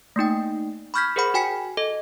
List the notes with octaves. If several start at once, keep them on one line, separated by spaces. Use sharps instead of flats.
A3 A#3 D#4 G5
B5 C#6 F6 G6 G#6 B6
G#4 A#4 C5 F#5 B5
F#4 G5 G#5 B6 C#7
A4 D#5